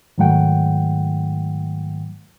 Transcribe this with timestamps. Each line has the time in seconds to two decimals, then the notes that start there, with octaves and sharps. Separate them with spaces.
0.18 G#2 D#3 F#3 A3 F#5 G5